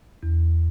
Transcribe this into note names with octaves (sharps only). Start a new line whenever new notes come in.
E2